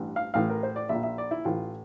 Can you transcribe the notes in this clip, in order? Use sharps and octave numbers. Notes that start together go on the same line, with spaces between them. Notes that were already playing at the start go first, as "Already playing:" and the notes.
Already playing: A1 G2 E3
F5
A1 A2 E3 F5
A#4
C5
D5
A#1 A#2 E5
E5
D5
E4
A1 A2 E3 F4